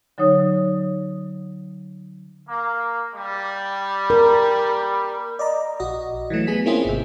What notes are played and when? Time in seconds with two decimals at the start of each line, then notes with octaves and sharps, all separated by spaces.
0.18 D3 F#3 D#4 C#5 D#6
2.48 A#3
3.14 G3
4.10 A#4
5.39 D5 D#5 A#5
5.80 A#1 F#4 D#5
6.30 E3 F#3 A3
6.47 B3 G#4 B6
6.66 A#3 C4 C#4 E4 F4 G#4
6.85 G#1 C3